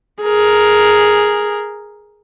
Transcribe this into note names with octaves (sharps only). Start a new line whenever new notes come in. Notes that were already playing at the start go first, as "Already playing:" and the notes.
G#4 A#4